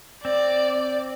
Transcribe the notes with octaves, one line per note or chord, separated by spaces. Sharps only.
C4 D5